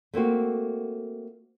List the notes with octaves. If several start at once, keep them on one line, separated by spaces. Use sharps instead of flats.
A3 A#3 C4 F#4